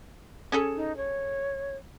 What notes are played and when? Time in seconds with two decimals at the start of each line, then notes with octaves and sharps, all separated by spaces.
0.52 C#4 G#4 A4
0.76 D#4
0.97 C#5